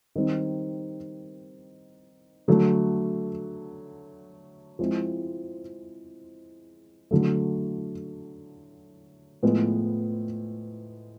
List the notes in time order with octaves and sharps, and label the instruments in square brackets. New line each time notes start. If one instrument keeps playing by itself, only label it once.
[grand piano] D#3 G3 C4
D3 F#3 A3
F3 G#3 C4 E4
D3 F#3 A3
A2 F3 G#3 B3